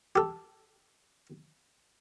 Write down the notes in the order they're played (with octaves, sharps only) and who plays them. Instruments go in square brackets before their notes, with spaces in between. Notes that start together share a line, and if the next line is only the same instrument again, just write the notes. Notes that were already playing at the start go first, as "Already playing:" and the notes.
[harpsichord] G4 A4